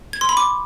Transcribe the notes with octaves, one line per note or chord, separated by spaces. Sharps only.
G#6
C6
B5
D6